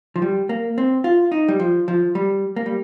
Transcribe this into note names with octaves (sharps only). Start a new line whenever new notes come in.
F3
G3
A#3
C4
F4
D#4
G3
F3
F3
G3
A#3
G3